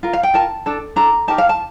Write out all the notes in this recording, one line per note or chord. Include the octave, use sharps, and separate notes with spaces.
F4 A#4
F5
G5
F4 A#4 A5
D4 A4
D4 A4 A#5
D#4 G4 A#4 A5
F5
A5